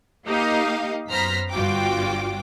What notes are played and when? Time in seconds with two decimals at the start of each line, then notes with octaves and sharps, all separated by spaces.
0.26 A#3 D#4 G4 D#5 F5
1.10 F#2 B3 C5 A#5 F6 B6
1.51 G1 G2 F4 F#4 G5 D6